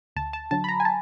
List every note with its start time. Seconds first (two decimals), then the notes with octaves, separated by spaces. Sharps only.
0.16 D2 A5
0.33 A5
0.51 D3 F#3 A5
0.64 B5
0.68 A#5
0.80 G#5
0.85 A5